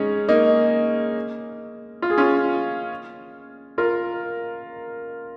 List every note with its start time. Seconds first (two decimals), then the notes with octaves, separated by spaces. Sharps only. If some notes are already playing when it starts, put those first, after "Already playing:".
Already playing: G#3 C#4 D#4
0.28 A#3 D#4
2.02 F4
2.10 G#4
2.18 C#4 F4
3.78 F4 A#4